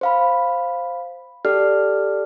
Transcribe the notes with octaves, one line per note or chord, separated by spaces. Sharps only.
C5 F5 B5
G4 A4 D5 F6